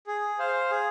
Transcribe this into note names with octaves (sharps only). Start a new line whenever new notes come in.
G#4
C5 F5
G#4